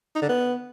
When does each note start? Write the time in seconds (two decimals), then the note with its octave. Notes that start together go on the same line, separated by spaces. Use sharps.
0.15 D#4
0.22 D3
0.29 B3